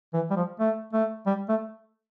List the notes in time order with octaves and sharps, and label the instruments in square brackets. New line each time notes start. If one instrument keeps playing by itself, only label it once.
[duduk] E3
G3
F3
A3
A3
G3
A3